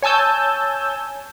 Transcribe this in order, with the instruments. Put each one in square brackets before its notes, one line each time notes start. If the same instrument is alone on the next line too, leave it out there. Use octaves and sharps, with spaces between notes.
[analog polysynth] C#5 G#5 A5 E6 G6